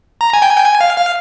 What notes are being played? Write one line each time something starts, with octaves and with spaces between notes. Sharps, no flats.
A#5
G#5
G5
G#5
G5
G#5
F5
F5